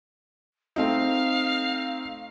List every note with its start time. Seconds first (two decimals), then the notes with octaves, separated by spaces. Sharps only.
0.76 A3 C4 D#4 F5